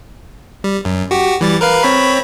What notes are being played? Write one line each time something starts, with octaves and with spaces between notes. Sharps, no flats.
G3
F#2
F#4 G4
E3 G3 A6
A#4 B4 F5
C4 C#5 B5